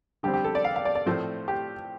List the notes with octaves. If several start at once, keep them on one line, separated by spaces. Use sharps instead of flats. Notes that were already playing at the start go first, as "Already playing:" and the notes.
D3 G3 C4 G4
G4
A4
D5
F5
F5
D5
D5
A2 F3 A3 C4 C5
G4